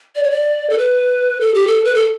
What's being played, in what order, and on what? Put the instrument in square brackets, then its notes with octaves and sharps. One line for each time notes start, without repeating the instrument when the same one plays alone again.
[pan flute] D5
C#5
D5
A4
B4
A4
G4
A4
B4
A4